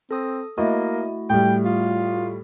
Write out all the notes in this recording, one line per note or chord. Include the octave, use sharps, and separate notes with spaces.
C4 A4 D#6
A3 A#3 E4 F#4 D#5
A2 G3 G5
F4